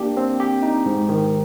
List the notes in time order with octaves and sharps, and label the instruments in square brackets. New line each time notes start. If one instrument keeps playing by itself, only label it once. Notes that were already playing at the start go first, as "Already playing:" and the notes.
Already playing: [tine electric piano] A#3 D4 G4
C4
G4
D#4
G#2
D#3